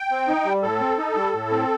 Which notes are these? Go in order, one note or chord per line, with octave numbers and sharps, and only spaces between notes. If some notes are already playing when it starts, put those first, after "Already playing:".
Already playing: G5
C4
D#4
G3
A2 A4
C4
D#4
G3
A2
C4